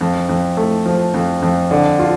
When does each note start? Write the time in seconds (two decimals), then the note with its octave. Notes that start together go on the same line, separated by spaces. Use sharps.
0.01 F2
0.29 F2
0.57 A3
0.86 F3
1.14 F2
1.42 F2
1.71 D3
1.99 F4